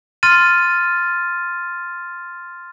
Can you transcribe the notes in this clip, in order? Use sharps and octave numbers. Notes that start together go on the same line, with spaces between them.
C6 F6 A6 D#7